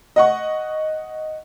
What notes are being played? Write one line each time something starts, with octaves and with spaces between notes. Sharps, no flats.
D#5 F#5 C#6